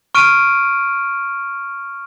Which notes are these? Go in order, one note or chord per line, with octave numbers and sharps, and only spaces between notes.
C#6 F6 D7 D#7